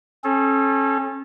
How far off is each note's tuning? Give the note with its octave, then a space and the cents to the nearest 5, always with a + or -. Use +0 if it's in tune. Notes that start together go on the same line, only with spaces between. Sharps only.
C#4 -30 A4 -30